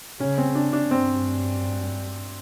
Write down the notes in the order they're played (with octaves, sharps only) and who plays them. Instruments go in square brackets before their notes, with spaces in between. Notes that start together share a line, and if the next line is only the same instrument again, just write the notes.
[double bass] C#3 [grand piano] C#4
[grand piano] C4
D4
D4
[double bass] G2 [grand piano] C4